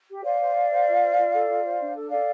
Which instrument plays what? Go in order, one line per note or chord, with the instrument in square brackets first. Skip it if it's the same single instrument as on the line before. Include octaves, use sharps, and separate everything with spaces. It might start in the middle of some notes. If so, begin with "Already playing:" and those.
[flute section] G4
C5 D5 F5
C5
C5
C5
F4
C5
F4
A4
F4
C5
D4
A4
A4 D5 F5